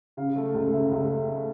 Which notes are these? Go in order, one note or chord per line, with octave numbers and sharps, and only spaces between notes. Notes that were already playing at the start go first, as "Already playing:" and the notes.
C#3 F5
A3
C#2
C#3 E5
C#2
A3
A3